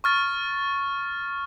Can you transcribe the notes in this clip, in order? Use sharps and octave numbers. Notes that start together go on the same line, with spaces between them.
C#6 F6 A6